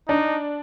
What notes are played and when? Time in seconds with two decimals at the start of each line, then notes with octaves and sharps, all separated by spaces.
0.09 D4 D#4